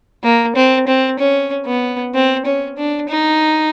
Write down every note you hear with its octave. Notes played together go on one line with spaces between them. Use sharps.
A#3
C4
C4
C#4
B3
C4
C#4
D4
D#4